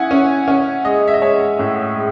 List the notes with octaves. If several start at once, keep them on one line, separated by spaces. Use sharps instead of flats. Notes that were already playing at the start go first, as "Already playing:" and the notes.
Already playing: C#4 E4 F#5 G#5 D#6
C#4
C#4
G#3 D#5
E5
D#5
G#3 C#5
A2
G#3